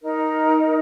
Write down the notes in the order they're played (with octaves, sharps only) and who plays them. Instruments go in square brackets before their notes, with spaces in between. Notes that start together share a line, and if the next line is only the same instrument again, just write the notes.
[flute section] D#4 A#4